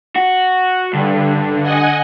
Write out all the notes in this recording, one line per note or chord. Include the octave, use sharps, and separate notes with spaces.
F#4
G2 D3
D#5 F#5 G#5